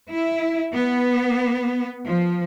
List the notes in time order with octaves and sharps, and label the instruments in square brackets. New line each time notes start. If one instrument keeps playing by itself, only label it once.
[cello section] E4
B3
F3